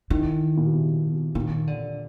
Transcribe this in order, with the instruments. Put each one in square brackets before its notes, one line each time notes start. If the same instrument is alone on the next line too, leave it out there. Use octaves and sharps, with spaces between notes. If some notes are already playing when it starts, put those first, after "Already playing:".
[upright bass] D#3 [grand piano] E3
[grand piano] A#2
B2
C3
B2
[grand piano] A#2 [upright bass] D#3
[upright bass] D3